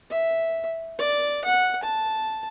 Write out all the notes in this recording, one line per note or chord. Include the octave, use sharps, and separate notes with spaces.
E5
D5
F#5
A5